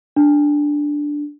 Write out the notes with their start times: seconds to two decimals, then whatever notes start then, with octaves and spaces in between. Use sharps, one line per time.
0.16 D4